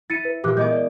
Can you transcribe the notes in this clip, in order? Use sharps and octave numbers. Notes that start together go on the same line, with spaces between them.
E4 A6 C#7 D#7
B4
A#2 E3 G4 D6 F#6
G#3 B3 D#5 D6 G6
D5